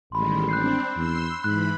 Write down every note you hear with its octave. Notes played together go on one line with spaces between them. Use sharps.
A1 D#3 G3 G#3 B5 C6
C4 D4 F#6 G6 C7
E2 C6 E6
G#2 E3 B5 F#6